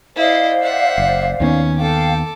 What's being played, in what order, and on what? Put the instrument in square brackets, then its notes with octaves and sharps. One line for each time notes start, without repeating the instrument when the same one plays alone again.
[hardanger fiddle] E4 D#5 [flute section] C5 D5 F5
[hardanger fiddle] E5 F#5
[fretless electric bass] F#1
[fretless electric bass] D#2 D#3 B3 [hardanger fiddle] C#4
[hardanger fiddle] A4 D6 [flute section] F5 G5